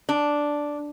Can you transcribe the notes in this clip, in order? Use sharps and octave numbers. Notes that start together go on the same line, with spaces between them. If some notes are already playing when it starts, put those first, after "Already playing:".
D4